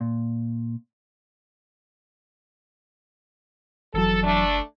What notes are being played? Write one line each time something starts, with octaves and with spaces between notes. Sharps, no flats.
A#2
F#1 F2 E3 F#3 A4
A3 D4